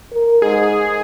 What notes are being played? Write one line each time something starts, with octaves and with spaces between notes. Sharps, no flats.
A#4
G#2 G#4